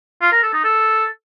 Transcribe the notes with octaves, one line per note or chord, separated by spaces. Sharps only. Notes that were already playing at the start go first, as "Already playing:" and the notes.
F4
A#4
A4
D#4
A4